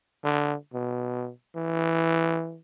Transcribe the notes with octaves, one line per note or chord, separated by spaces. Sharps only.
D3
B2
E3